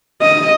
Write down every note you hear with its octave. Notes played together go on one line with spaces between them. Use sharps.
D#5